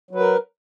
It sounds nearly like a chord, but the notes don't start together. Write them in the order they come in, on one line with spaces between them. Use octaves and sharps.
F#3 B4 A#4